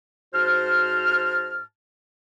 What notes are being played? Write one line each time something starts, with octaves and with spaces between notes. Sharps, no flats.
G#2 F#4 C5 A5 F6